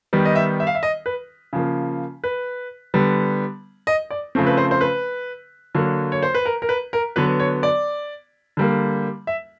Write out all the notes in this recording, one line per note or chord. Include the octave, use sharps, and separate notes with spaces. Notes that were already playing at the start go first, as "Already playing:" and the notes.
D#3 G3 B3
D#5
E5
E5
F5
E5
D#5
B4
C#3 F3 A#3
B4
D3 G3 B3
D#5
D5
C#3 F3 A3 C4
B4
C5
C5
B4
D3 F#3 A#3
C#5
C5
B4
A#4
A#4
B4
A#4
D3 F#3 B3 B4
C#5
D5
D3 G3 A#3
E5